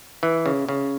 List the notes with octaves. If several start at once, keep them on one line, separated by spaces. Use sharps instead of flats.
E3
C#3
C#3